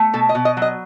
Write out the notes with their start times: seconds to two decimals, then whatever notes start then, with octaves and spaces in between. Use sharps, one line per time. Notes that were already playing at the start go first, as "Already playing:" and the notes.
Already playing: A3
0.13 B2 A4
0.29 D#5
0.35 B2
0.45 D#5
0.57 F#3
0.62 D#5